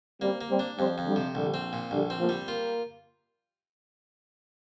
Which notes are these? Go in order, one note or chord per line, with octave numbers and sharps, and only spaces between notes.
G3 A#3 C4
A#3
G3 C4
D4
F2 G3 C4
F2
D3 G3
C3
A#1 D3 G3
C4
A#2
A#1 D3 G3
C4
F3 A#3
G3
A#3 F4